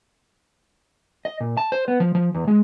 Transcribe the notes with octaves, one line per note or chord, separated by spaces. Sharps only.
D#5
A#2
A5
C5
B3
F3
F3
E2
G#3